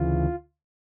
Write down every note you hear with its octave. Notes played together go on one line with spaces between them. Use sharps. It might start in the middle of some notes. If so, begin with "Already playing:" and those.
Already playing: D2 C#3 E3 F4